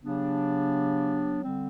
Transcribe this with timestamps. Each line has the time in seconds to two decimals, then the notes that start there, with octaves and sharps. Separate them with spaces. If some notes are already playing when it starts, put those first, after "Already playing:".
0.01 C#3 F#3 B3 D4 G4
1.42 D3 G3 C4